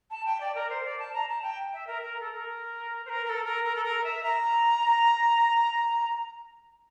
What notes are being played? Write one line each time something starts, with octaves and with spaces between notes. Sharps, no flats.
A5
G5
D5
A#4
C5
D5
A5
A#5
A5
G5
E5
A#4
A#4
A4
A#4
C5
A#4
A#4
A4
A#4
A#4
A4
A#4
E5
A#5